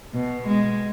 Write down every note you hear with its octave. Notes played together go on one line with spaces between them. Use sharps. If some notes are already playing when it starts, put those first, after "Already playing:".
B2
G#3